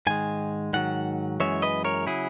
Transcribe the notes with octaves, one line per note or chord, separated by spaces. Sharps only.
G#2 D#3 G#3 G#5
G#2 D#3 F#3 F#5
F#2 E3 G#3 C#5 E5
B4 D#5
A#4 C#5
C#3 F#3 E4 G#4